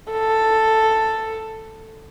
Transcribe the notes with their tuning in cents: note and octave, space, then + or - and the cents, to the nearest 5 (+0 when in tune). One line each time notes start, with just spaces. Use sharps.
A4 +5